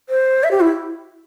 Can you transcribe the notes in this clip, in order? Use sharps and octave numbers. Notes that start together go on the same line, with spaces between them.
C5
E5
G4
E4